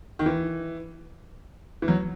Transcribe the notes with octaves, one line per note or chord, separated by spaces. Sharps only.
D#3
E3
E3
F#3